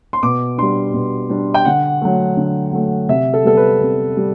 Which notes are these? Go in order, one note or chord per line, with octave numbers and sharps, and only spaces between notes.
C6
B2 D6
G3 D4 C6
B2
G3 D4
G5
D3 F#5
F#3 A3
D3
F#3 A3
C3 E5
A4
G3 B3 A4
B4
C3
G3